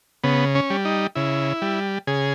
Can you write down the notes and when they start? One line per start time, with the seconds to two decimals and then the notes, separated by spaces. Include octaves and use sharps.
0.23 C#3 B3
0.55 C#4
0.70 G3
0.85 D#4
1.15 C#3 E4
1.62 G3
2.07 C#3 G#4